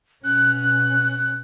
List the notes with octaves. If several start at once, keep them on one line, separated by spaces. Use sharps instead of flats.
B2 C#4 F#6